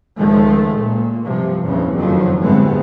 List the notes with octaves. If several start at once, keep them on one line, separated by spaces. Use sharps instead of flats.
C#2 D#3 F3 G#3 A3
A#2
G2 C3 F3
A#1 E2 G2 C#3 E3 F3
F#1 F2 D#3 F3 F#3
G1 A2 G#3 A3 B3 C4